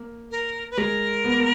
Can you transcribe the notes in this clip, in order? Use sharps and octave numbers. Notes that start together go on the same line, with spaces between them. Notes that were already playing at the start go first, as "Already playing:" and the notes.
Already playing: A#3
A#4
B4
G#3 A#4
B3
A#3